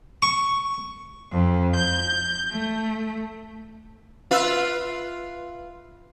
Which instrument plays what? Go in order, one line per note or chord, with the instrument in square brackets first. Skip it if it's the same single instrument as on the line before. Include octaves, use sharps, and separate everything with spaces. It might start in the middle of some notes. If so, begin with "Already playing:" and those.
[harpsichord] C#6
[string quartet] F2
G6
A3
[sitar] F4 B4 E5